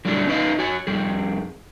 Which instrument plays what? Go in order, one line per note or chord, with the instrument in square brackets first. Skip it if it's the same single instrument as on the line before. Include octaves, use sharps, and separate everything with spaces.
[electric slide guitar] D3 F#3 G3 A3 D4 E4
C#4 D#4 B4 C#5 D#5 F5
F#4 C#5 G#5
F2 G3 G#4